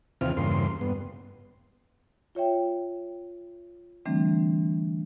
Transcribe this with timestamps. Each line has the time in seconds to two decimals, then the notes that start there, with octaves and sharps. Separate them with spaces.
0.21 D#2 C3 E3 C4 F4 F6
0.37 E2 G2 C#3 A#3 C6
0.81 G2 B3
2.35 F4 C#5 E5 G5
4.06 D3 E3 G3 A3 C4 D4